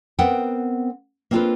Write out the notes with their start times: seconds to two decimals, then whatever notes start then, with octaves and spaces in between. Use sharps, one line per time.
0.19 B3 C4 A#4 F#5 G5
1.31 A#3 C4 D4 F4 A4 B4